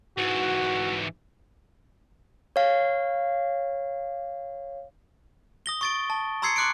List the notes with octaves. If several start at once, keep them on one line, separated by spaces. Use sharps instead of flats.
G#2 E3 F#4
C#5 F5
D#6 A#6 G7
C#6 A6 D7
A5
A#5 C6 E6 G#6 C7 C#7
C6 D6 F#6 C#7 D7